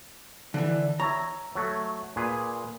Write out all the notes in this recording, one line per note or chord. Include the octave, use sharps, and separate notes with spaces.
D3 E3
C#5 E5 A#5
F#3 A3
A#2 G#4 B4